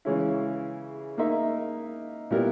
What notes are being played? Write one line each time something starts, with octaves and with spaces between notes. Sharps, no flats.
C#3 E3 G#3 C#4 E4
A#3 D#4 A#4 E5
A#2 G3 B3 E4 A#4